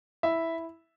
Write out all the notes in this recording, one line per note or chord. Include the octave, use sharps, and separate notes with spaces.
E4 E5